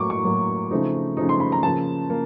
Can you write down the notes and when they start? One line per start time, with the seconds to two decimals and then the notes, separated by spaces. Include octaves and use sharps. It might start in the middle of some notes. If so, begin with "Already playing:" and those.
Already playing: A2 F#3 A#3 C#6 D6
0.10 C#6
0.24 A2 F#3 A#3
0.71 C#3 F3 A3 C4 D#4
1.17 C#3 F3 A3 C4 D#4
1.29 C6
1.40 B5
1.52 A#5
1.63 C#3 F3 A#3 A5
2.10 F3 A#3